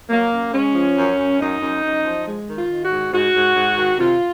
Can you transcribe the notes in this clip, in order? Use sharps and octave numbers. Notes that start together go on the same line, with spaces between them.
F#3 A#3
F#2
G#3 C#4
F3
F#2
F#2
F#2 D#4
F#2
F#2
F3
G#3
D#3
F4
D#3
F#4
G#2
G#2 F#4
G#2
G#2
D#3
C3 F4